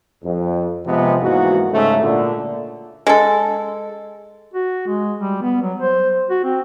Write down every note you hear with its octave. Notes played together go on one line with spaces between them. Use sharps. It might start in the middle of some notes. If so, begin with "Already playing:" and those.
F2
C3 F3 G#3 B3 C4
E2 G#2 A#3 F#4
G#2 C#3 A3
A#2 D3
G#3 A4
F#4
G#3
G3
B3
F#3
C5
F#4
C4